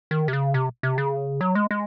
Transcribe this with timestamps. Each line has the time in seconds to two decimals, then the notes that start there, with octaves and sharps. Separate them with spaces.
0.11 D#3
0.28 C3
0.33 C#3
0.54 C3
0.83 C3
0.98 C#3
1.41 F#3
1.55 G#3
1.71 G#3